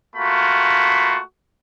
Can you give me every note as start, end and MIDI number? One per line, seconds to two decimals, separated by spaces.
0.16 1.20 57
0.16 1.20 58
0.16 1.20 65
0.16 1.20 66
0.16 1.20 83